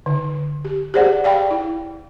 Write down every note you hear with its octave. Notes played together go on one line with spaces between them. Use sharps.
D3
G4
G4 G#4 C5 D5 F#5
D5 F5 G5 B5
E4